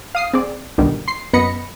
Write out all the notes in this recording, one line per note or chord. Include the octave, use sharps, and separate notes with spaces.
F5 D#6 C7
C4 G#4 D5
C#2 G2 B2 D3 D#3 G3
C6 C7
F#2 B3 D#5 B5 A#6 C#7